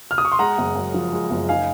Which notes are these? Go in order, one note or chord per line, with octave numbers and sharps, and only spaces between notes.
F6
D#6
C#6
C6
G#3 F#5 A#5
F#1
F#2
F3
G#3
F#1
D#4 F5 G#5